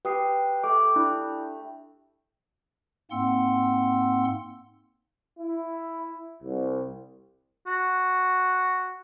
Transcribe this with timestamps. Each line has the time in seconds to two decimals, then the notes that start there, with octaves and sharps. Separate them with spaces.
0.05 G4 B4 D#6 C7
0.64 A3 G5 D6
0.96 D4 E4
3.11 G#2 A#3 C4 F#5 C6 E6
5.38 E4
6.43 C2
7.67 F#4